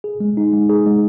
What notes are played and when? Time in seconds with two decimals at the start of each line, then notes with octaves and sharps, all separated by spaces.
0.04 G#4
0.20 G#3
0.37 D#4
0.53 G#3
0.69 G#4
0.86 G#3